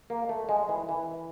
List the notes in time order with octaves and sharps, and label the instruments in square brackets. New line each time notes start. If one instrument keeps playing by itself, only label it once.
[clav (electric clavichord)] A#3
A3
G#3
E3
E3